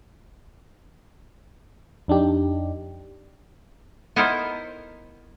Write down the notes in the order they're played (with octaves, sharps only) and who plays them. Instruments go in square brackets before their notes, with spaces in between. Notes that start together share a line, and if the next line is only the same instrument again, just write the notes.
[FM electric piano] F2 D4 D#4 G4
[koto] B3 D#4 E4 A4 A#4 C5